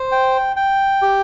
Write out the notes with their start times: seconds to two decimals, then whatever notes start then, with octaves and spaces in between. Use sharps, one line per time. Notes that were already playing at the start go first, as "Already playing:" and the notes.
Already playing: C5
0.12 G5
0.56 G5
1.02 G4